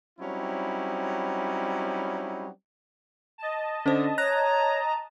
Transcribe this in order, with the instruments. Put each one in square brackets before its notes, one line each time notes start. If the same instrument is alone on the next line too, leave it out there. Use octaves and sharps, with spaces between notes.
[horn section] F#3 G3 C4 C#4 D#4 E4
[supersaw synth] D#5 A5
[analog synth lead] D3 [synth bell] C#4 C5
[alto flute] C#5 [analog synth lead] A#5 [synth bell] F#6